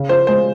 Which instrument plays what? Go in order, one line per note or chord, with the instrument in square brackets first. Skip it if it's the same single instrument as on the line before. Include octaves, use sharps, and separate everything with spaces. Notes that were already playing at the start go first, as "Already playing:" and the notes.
Already playing: [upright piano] C#3
F3 C5
G#3 C5